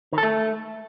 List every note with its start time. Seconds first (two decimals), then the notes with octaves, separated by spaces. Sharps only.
0.13 D#3
0.18 A4
0.23 A3